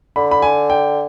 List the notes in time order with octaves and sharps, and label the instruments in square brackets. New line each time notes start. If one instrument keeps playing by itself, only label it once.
[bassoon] D3 [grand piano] B5
[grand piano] B5
G#5
G5